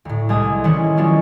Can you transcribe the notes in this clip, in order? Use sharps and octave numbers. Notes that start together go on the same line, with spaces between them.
D2 A2
C2 G#3 D4 G#5 D#6
D#3 E3 G#3 C#4 E4 C#5
F3 F#3 G#3 C#4 D4 F4